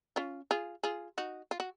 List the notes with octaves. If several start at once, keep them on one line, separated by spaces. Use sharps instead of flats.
C#4 F4
F4 G#4
F4 G#4
D#4 F#4
F4
F#4